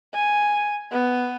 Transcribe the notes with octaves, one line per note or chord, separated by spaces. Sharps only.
G#5
B3